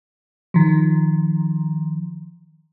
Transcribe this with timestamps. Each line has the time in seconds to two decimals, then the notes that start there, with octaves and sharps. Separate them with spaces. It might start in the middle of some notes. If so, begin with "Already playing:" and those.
0.54 D#3 F3